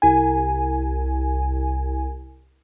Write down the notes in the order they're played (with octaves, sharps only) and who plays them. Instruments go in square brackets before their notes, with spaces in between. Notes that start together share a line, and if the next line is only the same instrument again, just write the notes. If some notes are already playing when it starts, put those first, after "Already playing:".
[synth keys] C2 G#5